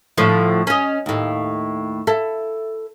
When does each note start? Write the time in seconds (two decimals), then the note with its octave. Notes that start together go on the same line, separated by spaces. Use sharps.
0.18 A2 D3 F3
0.67 C#4 D#5
1.06 D#2 A2
2.07 E4 A4